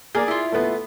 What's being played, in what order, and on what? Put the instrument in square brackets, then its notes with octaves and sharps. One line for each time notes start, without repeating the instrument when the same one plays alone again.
[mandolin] A#3 [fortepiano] G#4 A#4 D5
[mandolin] E4 F4
[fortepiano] A3 B3